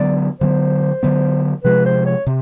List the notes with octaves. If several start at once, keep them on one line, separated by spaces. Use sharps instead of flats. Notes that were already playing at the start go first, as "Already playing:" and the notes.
Already playing: D3 F#3 B3 D5
D3 F#3 B3 C5
D3 F#3 B3
C3 F3 G#3 B4
C5
C#5
C3